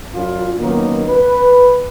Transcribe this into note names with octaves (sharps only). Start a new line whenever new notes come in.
F#2 D4 F4
D#3 F#3 A#3 B3 C#4
B4